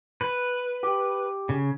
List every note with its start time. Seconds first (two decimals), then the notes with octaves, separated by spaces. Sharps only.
0.21 B4
0.83 G4
1.49 C#3